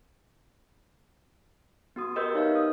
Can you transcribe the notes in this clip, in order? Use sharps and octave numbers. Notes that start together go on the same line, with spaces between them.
B3 F#4 D#6
G4 A#4 B4 D#5 E6 G6
D#4 C#5 E5 F5
D#6